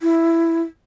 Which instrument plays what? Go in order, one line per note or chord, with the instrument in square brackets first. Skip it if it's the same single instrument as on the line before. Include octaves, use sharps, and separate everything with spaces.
[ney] E4